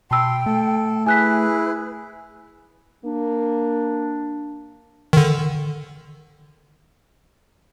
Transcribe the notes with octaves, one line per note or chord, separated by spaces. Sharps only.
B2 G5 A5 B5 C6 E6
A3 A4
E4 G#4 B4 G#5 F#6 B6
A#3 D4
D3 D#3